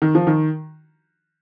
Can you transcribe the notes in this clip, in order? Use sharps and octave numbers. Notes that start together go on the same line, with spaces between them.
D#3
F3
D#3